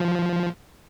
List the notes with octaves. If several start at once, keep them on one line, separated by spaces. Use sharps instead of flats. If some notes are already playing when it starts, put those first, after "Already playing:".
Already playing: F3